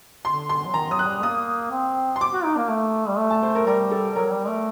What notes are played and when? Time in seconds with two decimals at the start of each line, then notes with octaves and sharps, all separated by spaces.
0.25 D3 C6
0.49 C6
0.66 F#3
0.74 D#3 A#5
0.90 F#3 D#6
0.99 F#6
1.07 G3
1.23 A#3 D#6
1.71 C4
2.16 C6
2.21 D6
2.33 F#4
2.44 D#4
2.57 A#3
2.69 A3
3.09 G3
3.18 A3
3.30 A5
3.43 C5
3.55 A#4
3.66 G3 A#4
3.91 A4
4.16 F#3 A#4
4.26 F#3
4.31 G3
4.48 A3